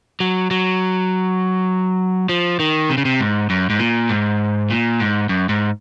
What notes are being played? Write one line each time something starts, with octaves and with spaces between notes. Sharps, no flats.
F#3
F#3
F3
D#3
C3
C#3
C3
G#2
F#2
G#2
A#2
G#2
A#2
G#2
F#2
G#2